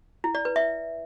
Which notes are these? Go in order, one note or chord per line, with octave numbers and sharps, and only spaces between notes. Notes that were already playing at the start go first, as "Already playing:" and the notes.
E4
D5
B4
E5